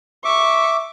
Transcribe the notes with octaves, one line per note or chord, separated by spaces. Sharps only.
E5 C#6 D6